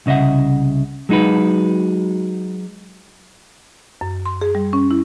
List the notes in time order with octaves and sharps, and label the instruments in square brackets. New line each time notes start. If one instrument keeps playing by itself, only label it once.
[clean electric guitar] C2 C#3 D#5 E5 F#5
F#3 G#3 D#4 F#4 B4
[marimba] F#2
C6
G#4
G3
C#4
E4